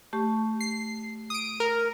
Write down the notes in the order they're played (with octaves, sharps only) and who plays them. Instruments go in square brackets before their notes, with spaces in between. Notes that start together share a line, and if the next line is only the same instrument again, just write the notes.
[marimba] A3 G4 C#6
[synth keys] C7
D#6 D7
A#4